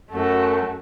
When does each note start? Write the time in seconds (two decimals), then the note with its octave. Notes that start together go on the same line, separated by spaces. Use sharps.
0.11 F#2 A3 F#4